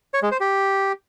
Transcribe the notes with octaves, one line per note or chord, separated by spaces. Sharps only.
C#5
G#3
C5
G4